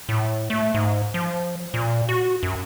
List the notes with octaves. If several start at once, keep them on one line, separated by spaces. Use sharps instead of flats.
A2
A3
G#2
F3
A#2
F#4
F#2